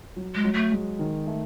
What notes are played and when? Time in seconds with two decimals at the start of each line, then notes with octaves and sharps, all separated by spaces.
0.16 F#3
0.35 G#3
0.44 F#3
0.54 A3
0.72 G#3
0.99 D#3
1.27 A3